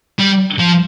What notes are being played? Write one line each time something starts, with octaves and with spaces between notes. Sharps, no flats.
G3
F3